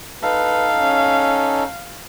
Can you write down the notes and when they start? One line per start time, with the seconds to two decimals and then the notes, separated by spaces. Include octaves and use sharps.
0.23 D#4 A4 B4 F5
0.75 C#4